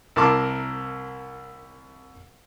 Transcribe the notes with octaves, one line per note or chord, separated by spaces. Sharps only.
C2 E4 A#4 A5 C6 D6